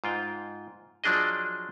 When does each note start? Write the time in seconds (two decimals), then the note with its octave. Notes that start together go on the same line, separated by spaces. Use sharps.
0.04 G#2 F4 G5
1.04 F3 F#3 D4 G#4 D#5